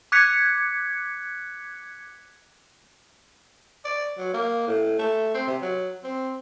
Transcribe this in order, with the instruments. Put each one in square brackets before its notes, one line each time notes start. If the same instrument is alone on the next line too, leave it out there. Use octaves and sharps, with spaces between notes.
[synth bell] D6 F#6 G#6 B6 C#7
[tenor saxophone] D5
F#3
A#3
A2
A3
C4
C3
F#3
C4